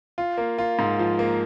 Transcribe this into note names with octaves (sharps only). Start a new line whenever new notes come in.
F4
A#3
F4
G#2
F3
A#3